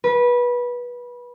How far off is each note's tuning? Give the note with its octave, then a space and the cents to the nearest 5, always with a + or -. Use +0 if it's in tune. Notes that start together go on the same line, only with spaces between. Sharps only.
B4 -20